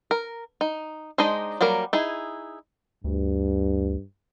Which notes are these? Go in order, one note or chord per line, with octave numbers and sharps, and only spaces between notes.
A#4
D#4
G#3 D4 D#4 C5 D#5
F#3 G3 A#3 A#4
D#4 E4 G#4
D2 G2